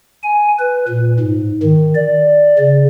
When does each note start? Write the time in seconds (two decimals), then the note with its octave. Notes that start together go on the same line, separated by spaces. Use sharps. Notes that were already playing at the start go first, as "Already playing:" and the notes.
0.23 G#5
0.59 B4
0.88 A#2
1.20 G#2
1.63 D#3
1.95 D5
2.59 C#3